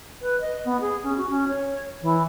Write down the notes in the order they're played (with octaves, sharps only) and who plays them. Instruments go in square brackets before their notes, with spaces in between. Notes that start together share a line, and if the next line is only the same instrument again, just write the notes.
[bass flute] B4
D#5
B3
G#4
C#4
F#4
C#4
C#5
E3